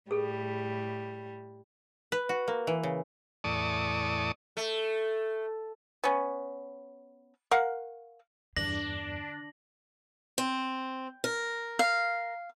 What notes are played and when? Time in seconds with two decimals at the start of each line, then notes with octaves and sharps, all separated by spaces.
0.11 A2 G3 G#4 A4
2.12 B4
2.29 F#4
2.48 A#3
2.67 E3
2.83 C#3
3.44 E2 A2 D5 A5 C#6 D#6
4.57 A3
6.04 B3 C#4
7.51 A#4 F5 F#5
8.57 E2 G2 D3 D4 A#6 F#7
10.38 C4
11.24 A#4
11.79 F5